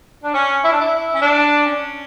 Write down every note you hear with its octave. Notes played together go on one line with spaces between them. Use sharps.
D4
C#4
E4
D4
E4
C#4
D4
C#4